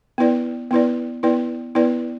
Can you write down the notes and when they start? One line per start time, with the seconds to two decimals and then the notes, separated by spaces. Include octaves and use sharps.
0.18 B3 E4 B4 D5
0.71 B3 E4 B4 D5
1.23 B3 E4 B4 D5
1.75 B3 E4 B4 D5